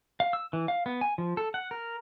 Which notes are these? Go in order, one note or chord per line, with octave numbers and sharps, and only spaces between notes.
F5
E6
E3
F5
B3
G#5
F3
A4
F#5
A#4